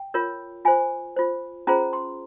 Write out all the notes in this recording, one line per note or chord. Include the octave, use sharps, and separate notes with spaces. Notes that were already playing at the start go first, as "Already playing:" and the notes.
Already playing: G5
F4 A#4 C#5
F4 C5 G#5
F4 C5
C#4 F4 G#4 C5 A#5
C6